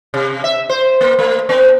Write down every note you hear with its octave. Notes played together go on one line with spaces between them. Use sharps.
C3
E5
C5
A#3
A3
B3